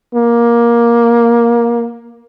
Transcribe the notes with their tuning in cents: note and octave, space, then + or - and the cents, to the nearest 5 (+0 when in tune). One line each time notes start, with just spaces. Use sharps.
A#3 +15